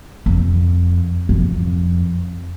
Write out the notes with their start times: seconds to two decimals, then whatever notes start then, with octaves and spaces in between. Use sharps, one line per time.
0.26 F2
1.29 F2